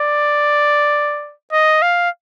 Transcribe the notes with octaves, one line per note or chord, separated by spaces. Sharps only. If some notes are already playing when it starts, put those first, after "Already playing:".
Already playing: D5
D#5
F5